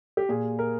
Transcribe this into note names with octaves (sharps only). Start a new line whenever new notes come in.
G4
A#2 G#4
A#4